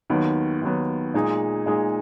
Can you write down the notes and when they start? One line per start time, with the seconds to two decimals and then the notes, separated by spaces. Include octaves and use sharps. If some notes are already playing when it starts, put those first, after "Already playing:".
0.10 D#2 D#3 F#3 B3
0.62 D#2 D#3 F#3 B3
1.14 A#2 G#3 D#4 G#4
1.66 A#2 G#3 D#4 G#4